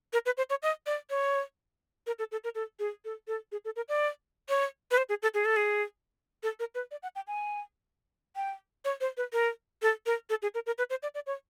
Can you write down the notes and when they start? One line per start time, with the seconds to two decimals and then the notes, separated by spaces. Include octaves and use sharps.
0.13 A#4
0.26 B4
0.37 C5
0.50 C#5
0.63 D#5
0.86 D5
1.10 C#5
2.07 A#4
2.19 A4
2.32 A4
2.44 A#4
2.55 A4
2.79 G#4
3.05 A4
3.28 A4
3.52 G#4
3.65 A4
3.76 A#4
3.89 D5
4.49 C#5
4.91 B4
4.97 C5
5.09 G#4
5.22 A4
5.34 G#4
5.45 A4
5.56 G#4
6.43 A4
6.60 A#4
6.75 B4
6.91 D5
7.03 F#5
7.16 G5
7.27 G#5
8.36 G5
8.85 C#5
9.01 C5
9.17 B4
9.33 A#4
9.82 A4
10.06 A#4
10.30 A4
10.42 G#4
10.54 A#4
10.66 A#4
10.78 B4
10.90 C5
11.03 D5
11.15 D5
11.27 C#5